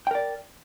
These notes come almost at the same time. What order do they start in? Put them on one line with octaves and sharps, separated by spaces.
G5 A#4 D5